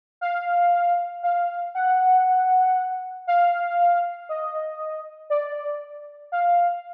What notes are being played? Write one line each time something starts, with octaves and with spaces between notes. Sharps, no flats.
F5
F5
F#5
F5
D#5
D5
F5